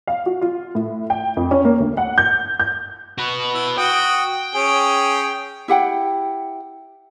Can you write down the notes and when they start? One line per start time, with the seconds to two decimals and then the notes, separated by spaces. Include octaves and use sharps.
0.07 F5
0.26 F#4
0.41 F4
0.75 A2
1.10 G5
1.37 F2
1.51 C#4
1.65 A#3
1.80 D2
1.97 F#5
2.18 G6
2.60 G6
3.18 F#4 B4
3.54 E4
3.78 F#4 G5 D#6
4.55 C#4 G#4
5.68 E4 G4 F#5 G5